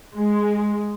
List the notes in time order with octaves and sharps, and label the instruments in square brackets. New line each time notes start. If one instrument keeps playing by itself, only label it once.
[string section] G#3